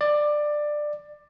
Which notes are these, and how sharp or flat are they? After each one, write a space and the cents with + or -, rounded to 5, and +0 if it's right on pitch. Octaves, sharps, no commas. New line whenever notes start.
D5 +15